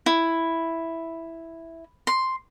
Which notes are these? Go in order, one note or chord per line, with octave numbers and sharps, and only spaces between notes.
E4
C6